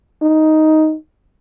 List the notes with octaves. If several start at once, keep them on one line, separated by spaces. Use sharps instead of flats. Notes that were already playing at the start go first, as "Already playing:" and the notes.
D#4